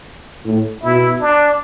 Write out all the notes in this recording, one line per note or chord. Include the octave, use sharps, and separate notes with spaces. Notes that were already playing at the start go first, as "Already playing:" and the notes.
A2
B2 E4
D4